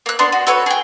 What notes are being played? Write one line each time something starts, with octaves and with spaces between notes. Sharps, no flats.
A#3 F#6
B3 D4 C6
F#4
F#4 A4 B4 C#5
G#4 G5